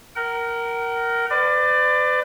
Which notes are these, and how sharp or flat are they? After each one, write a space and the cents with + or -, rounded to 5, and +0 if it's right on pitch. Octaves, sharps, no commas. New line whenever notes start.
A#4 +0 F#5 +45
B4 +45 D5 +20